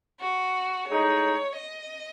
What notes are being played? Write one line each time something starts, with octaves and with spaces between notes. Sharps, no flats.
F#4
A2 G#3 D#4 C#5
D#5